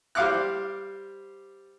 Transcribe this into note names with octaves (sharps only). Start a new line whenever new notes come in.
G3 C5 F5 D6 F6 F#6